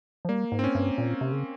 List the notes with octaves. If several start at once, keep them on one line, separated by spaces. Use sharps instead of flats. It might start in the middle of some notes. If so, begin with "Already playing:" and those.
F3
G3 A#3
G#2
C4
C#4
G2
A#2
C3
C#3